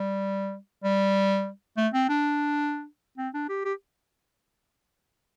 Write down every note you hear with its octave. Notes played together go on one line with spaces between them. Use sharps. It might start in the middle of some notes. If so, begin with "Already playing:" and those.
Already playing: G3
G3
A3
C4
D4
C4
D4
G4
G4